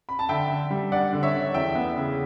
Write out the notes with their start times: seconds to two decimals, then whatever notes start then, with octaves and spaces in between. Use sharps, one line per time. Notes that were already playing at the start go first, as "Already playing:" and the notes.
0.09 B5
0.19 A5
0.29 D3 E5 G5
0.50 D3
0.70 G3
0.92 D4 D5 F#5
1.13 D3
1.23 C#5 E5
1.34 D3
1.54 E2 E5 G5
1.75 B3
1.96 C#3